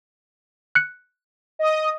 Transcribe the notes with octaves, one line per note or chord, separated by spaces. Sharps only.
F#6 C#7
D#5 D#6